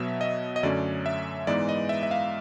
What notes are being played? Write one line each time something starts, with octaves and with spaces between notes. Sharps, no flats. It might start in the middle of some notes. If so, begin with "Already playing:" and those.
Already playing: B2 F#3 B3 E5
D#5
D#5
F#2 D3 F#3 A3 C#4 D5
E5
G#2 E3 G#3 B3 D#4 D5
D#5
E5
E5
F5